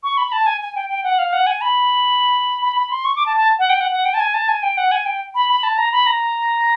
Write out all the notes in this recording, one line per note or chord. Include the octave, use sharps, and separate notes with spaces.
C#6
B5
A5
G#5
G#5
G5
G5
F#5
F5
F#5
G#5
B5
B5
B5
C6
C#6
D6
A5
A5
F#5
G5
F#5
F#5
G5
A5
G#5
A5
G#5
G5
F#5
G#5
G5
B5
B5
A5
A#5
B5
A#5